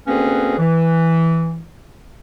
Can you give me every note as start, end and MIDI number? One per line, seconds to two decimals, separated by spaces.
0.07 0.56 38
0.07 0.56 58
0.07 0.56 60
0.07 0.56 61
0.07 0.56 68
0.07 0.56 71
0.59 1.63 52